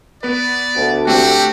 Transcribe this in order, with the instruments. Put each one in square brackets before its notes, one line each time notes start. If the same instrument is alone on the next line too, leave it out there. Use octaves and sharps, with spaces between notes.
[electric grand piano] B3 B4 [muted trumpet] D5
[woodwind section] D2
[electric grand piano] A3 C4 [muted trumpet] F#4 [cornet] G4